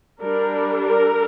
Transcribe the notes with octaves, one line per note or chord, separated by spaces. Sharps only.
G3 D4 A#4
A#4